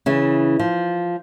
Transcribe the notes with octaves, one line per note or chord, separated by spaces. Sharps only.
C#3 E3
F3